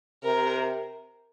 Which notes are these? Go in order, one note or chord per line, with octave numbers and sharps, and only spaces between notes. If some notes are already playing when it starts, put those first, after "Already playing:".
C3 A#4